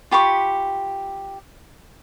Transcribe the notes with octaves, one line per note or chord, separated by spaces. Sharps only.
F4 G4 B5 C#6